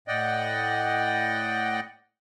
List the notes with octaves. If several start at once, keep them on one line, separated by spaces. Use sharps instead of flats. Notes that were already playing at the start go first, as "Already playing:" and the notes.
A2 D5 D#5 F#5 G5